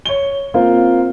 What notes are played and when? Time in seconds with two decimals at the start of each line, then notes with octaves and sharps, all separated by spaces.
0.05 C#5 G7
0.54 A#3 C4 F4